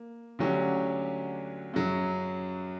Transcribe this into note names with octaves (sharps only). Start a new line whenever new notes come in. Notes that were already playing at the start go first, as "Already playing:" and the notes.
Already playing: A#3
D2 D3 F#3 C#4 G4
F#2 C#3 F#3